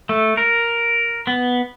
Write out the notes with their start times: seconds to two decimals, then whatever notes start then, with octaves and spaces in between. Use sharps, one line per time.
0.09 A3
0.37 A#4
1.27 B3